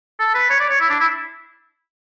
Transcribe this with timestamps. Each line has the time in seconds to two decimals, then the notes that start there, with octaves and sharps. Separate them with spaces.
0.19 A4
0.34 B4
0.50 C#5
0.60 D5
0.70 C#5
0.80 E4
0.90 D4
1.00 E4